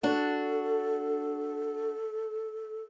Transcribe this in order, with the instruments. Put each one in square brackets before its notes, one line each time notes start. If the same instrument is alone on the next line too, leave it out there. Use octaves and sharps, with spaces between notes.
[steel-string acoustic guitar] D4 F#4 [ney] A4